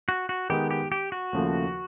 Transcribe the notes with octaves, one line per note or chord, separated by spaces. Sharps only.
F#4
F#4
D#3 G#3 B3 D#4 G4
G4
G4
F#4
D#2 C#3 F3 A3